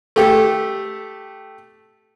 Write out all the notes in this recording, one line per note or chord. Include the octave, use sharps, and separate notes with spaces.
A3 G4 A4